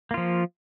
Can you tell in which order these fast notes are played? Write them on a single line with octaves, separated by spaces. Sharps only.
A#3 F4 F3